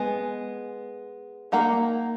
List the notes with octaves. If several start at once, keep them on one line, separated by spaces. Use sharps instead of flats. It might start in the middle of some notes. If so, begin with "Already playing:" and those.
Already playing: G#3 B3 G#5
D#3 A#3 D#4 F#5 A#5